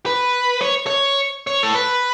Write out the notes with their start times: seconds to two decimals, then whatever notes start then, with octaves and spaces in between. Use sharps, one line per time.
0.06 B4
0.61 C#5
0.87 C#5
1.47 C#5
1.63 A4
1.75 B4